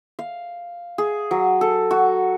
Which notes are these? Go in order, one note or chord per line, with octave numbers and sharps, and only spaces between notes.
F5
G#4
F#3
A4
F#4